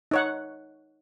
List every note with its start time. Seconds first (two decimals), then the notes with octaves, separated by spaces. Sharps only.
0.11 D#4 C#5 F#5